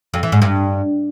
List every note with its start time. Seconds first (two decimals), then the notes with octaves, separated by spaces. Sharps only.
0.14 F2
0.23 E3
0.32 G#2
0.42 G2